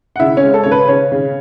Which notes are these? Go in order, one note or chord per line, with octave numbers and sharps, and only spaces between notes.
F#5
C#3 E4 E5
C#4 C#5
G#3
A4
C#3 C#5
B4
C#3 C#4 C#5
C#3